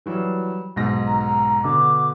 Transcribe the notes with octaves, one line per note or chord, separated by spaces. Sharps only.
E3 F#3 G3
B1 G#2 A#6
A#5
B2 D3 D6